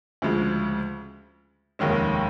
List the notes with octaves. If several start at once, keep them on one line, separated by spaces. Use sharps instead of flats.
D2 C#3 F3 G#3
F1 D#2 D#3 G#3 C#4